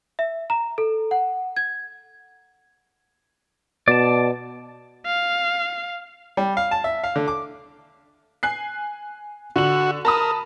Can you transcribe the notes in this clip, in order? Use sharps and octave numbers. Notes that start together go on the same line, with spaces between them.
E5
A#5
A4
F#5
G#6
B2 D5 A5
F5
G3
F5
A5
E5
F5
D3
D6
G#5 F#6 C7
D3 F#4 F#7
A#4 A5 B5 D#6